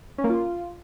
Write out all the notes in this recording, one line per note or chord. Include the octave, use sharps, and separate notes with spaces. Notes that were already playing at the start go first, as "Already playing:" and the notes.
C#4
A#3
F4